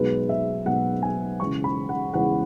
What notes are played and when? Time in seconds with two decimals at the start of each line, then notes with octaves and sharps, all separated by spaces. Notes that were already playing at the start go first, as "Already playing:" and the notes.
Already playing: B1 B2 G#3 B4
0.29 E5
0.66 B1 B2 G#3 F#5
1.03 G#5
1.40 E1 E2 C#3 C#6
1.64 B5
1.89 F#5
2.14 E1 E2 C#3 F#5